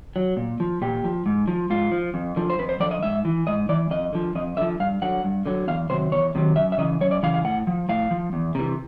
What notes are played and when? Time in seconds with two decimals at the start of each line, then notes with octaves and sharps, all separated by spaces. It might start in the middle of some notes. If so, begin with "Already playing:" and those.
0.16 F#3
0.37 A#2
0.60 F3
0.82 A#2 G4
1.04 F3
1.26 G#2
1.48 F3
1.70 G#2 F4
1.92 F3
2.14 F2
2.36 D3 F3
2.50 C5
2.59 F2 B4
2.69 C5
2.80 D3 F3 D5
2.91 D#5
3.03 G#2 E5
3.25 E3
3.47 G#2 D#5
3.69 E3 D5
3.91 F2 D#5
4.13 D3 F3
4.35 F2 D#5
4.57 D3 F3 E5
4.80 G2 F5
5.02 D3 F#3 F#5
5.24 G2
5.46 D3 F#3
5.68 E2 F5
5.90 C3 D#3 F#3 C5
6.12 E2 C#5
6.35 C3 D#3 F#3
6.56 F#2 E5
6.72 E5
6.78 C#3 E3 D#5
7.01 F#2 C#5
7.11 D5
7.23 C#3 E3 F5
7.34 F5
7.44 A2 F#5
7.67 F3
7.89 A2 F5
8.11 F3
8.33 E2
8.55 C3 E3